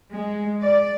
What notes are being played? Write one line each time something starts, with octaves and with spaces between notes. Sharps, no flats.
G#3
D5